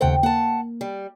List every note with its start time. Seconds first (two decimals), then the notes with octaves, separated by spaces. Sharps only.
0.01 D#2 C#3 A3 C5 F#5 G5
0.23 A#3 F#5 A5
0.81 G3